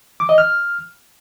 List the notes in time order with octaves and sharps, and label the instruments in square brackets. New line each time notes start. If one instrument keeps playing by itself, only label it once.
[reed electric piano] D6
D#5
F6